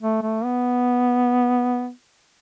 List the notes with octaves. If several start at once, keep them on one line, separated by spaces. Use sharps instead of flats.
A3
A3
B3